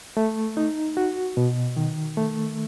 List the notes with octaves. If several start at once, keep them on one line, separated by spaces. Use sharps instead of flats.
A3
D#4
F#4
B2
D#3
A3